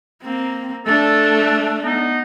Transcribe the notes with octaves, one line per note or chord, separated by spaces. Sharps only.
A#3 C4
A3 D4 A4
B3 D#4